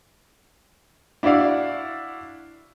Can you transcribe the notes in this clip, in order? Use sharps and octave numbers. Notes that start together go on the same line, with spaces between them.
D4 E4 F#4 D5 F5